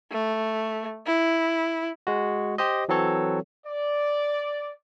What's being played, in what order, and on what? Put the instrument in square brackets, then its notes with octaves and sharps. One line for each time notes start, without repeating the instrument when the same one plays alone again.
[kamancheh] A3
E4
[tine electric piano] G#3 F#4
G4 C5 D#5
E3 F#3 C4 A4 C#5
[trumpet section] D5